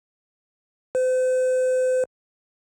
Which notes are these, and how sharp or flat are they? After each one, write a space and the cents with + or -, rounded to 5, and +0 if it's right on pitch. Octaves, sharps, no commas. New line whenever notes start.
C5 -40